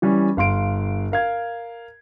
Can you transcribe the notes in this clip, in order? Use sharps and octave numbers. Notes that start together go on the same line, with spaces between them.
E3 G3 C#4
G1 F5 C6 D7
A#4 F5 G#6